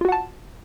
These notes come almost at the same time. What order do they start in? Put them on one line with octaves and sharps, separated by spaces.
F4 F#4 F#5 A5